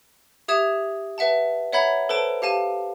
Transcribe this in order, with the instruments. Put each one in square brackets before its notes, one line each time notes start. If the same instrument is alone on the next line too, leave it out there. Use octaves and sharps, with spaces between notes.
[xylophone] G4 E5 D#6 G#6 E7 F7
B4 E5 F#5 A5
C#5 E5 F#5 A#5 B5 G#6
A4 B4 C5 A5 D7
G4 F5 A5 D#7